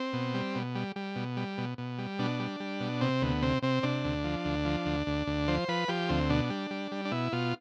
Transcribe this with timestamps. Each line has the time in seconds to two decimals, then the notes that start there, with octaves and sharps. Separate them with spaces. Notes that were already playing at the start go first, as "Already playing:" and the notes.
Already playing: C4
0.13 B2
0.34 G3
0.55 B2
0.75 G3
0.96 G3
1.16 B2
1.37 G3
1.58 B2
1.78 B2
1.98 G3
2.19 B2 D4
2.40 G3
2.60 G3
2.80 B2
3.01 C3 C4
3.22 D2 B3
3.42 C3 C4
3.62 C3 C4
3.83 C3 D4
4.04 D2
4.24 F3
4.45 D2
4.65 F3
4.86 D2
5.07 D2
5.27 D2
5.48 F3 C5
5.68 F3 B4
5.88 F3 G4
6.09 D2 C4
6.30 B2 D4
6.50 G3
6.71 G3
6.92 G3
7.05 D4
7.11 B2 E4
7.32 B2 F4